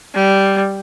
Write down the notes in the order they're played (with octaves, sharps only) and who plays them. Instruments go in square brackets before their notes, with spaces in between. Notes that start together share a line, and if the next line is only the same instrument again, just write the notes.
[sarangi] G3